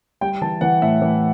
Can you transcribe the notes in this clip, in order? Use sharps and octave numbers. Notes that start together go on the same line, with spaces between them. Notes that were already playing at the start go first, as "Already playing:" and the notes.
G3 G5
E3 A5
E3 F#5
A2 E5
E3